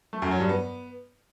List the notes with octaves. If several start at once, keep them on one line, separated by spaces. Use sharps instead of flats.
A3
F#2
F#3
G2
B3